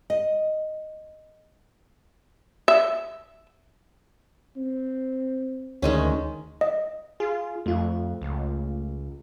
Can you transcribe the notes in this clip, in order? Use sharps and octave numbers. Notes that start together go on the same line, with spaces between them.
D#5
E5
C4
D2 D#3 G#3 C#4
D#5
F4 G#4
F2 A3 F4
C#2